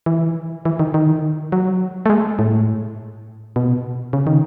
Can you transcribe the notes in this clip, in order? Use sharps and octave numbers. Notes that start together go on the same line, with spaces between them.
E3
E3
D#3
D#3
F#3
A3
G#3
A2
B2
C#3
D#3